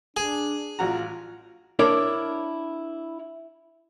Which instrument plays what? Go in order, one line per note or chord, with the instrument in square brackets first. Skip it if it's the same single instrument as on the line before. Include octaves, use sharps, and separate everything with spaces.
[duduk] D4 [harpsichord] G#4
[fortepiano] A1 F#4 A#5 [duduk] F4
[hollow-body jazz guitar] D4 E4 A#4 C#5 D5